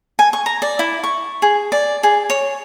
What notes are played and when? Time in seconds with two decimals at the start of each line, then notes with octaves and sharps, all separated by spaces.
0.19 G#5
0.33 C#6
0.46 A#5
0.62 D5
0.79 E4
1.04 C#6
1.42 G#4
1.72 D5
2.03 G#4
2.30 C#5